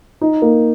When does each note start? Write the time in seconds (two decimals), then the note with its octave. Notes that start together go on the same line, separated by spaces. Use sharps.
0.21 D#4
0.42 A#3